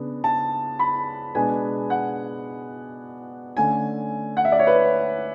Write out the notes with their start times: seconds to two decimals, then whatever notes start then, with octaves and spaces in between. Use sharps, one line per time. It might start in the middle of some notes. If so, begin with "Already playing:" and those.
Already playing: C#3 B3 D4
0.24 A5
0.79 B5
1.35 B2 G#3 B3 D4 G#5
1.90 F#5
3.57 D3 A3 C#4 G#5
4.37 F#5
4.45 E5
4.52 D5
4.59 C#5
4.67 B4